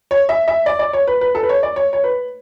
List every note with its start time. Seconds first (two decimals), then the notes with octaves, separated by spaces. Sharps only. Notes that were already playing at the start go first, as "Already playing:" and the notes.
0.11 C#5
0.29 E5
0.48 E5
0.66 D5
0.79 D5
0.93 C#5
1.07 B4
1.21 B4
1.35 A4
1.43 B4
1.49 C#5
1.63 D5
1.76 C#5
1.93 C#5
2.04 B4